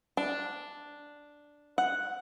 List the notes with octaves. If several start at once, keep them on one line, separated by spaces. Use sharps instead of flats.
D4
F#5